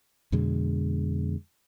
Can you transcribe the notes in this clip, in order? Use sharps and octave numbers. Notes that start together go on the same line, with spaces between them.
F2 B2 D3 G#3